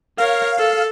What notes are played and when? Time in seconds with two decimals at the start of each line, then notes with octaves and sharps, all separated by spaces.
0.18 A#4 C#5 F5
0.59 A4